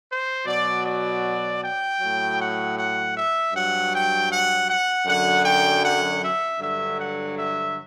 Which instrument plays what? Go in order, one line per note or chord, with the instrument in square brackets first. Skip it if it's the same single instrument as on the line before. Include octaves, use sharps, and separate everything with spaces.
[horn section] C5
B2 F#3 D5
D5
G5
A2 F#3
F#5
F#5
E5
G2 F#3 F#5
G5
F#5
F#5
F#2 D3 F#3 F#5
G5
F#5
E5
G2 D3 F#3 E5
F#5
E5